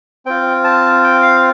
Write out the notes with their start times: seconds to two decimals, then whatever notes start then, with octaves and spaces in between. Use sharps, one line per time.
0.26 C4 F4 G5
0.64 A5
1.04 G5
1.22 F5